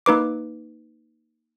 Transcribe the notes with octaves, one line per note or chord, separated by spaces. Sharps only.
A#3 D#4 B4 D6